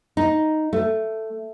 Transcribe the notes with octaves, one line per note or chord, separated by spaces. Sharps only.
D#4
A3